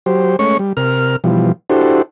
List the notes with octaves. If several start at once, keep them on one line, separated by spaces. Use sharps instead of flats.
F#3 G4 C5
G#3 A3 C#4 C#5 C#6
G3
C3 A#4 F6
B2 E3 F3 G3
D4 E4 F#4 G4 A4 C5